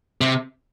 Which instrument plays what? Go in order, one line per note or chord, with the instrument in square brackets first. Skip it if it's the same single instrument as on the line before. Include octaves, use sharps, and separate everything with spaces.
[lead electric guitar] C3